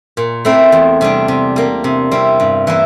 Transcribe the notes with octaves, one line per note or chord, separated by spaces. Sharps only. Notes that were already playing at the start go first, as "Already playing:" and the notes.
A#2
A3 C4 E4
E2
C3 G3 D4
C3
G3 A#3
C3
G3 C4 E4
G2
E3 A#3 E4